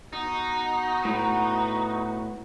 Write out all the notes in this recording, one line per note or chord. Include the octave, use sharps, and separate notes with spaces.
B3 D#4 F#4
A2 B4